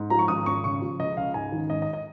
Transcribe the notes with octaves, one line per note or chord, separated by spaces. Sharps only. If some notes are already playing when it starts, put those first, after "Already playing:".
Already playing: G#2
F3 A#5
C#6
G#1 D#6
G#1 C#6
C#3 C#6
F3
C#2 D#5
C#2 F5
G#2 G#5
D#3
G#1 D#5
D#5
D#5